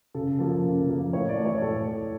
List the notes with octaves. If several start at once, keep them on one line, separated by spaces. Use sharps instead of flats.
C#3 A4
F3 A#3 A4
C#3
F3 A#3
A2 C#5
D5
E3 A3
C#5
A2 A4